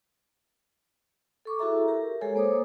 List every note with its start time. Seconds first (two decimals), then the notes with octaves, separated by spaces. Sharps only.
1.45 A4 C#6 D6
1.59 E4 F#4 G#4 A4 E5 A#5
1.88 G4 A#4
2.21 G#3 G#4 A4 C#5 G#5
2.35 A#3 C5 C#5 D6 D#6